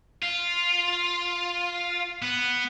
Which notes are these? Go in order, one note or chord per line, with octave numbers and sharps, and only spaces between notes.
F4
B3